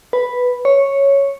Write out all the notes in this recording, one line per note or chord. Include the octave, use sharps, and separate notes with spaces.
B4
C#5